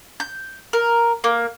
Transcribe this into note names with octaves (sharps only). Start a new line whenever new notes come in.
G6
A#4
A#3